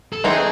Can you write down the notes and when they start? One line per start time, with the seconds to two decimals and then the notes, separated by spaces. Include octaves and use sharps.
0.13 A4
0.24 E3 A3 C4 D#4 G#4